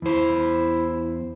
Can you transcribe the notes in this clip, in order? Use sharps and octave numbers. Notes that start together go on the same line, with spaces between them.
E2 E4 C5